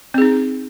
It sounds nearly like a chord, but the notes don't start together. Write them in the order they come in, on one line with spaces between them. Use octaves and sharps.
C4 G#4 D#4